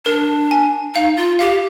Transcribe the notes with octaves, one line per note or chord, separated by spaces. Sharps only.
D4 A#4
G#5
D#4 F5
F4
G4 F5